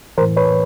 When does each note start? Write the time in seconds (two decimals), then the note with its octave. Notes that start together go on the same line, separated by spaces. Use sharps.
0.18 E3 A#4 C5
0.21 A2
0.37 B4 C#5